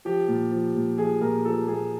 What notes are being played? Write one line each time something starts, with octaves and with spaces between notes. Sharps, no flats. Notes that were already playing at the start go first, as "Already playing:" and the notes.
F3 G4
A#2
F3
A#2
F3 G#4
A#2 A#4
F3 A4
A#2 G#4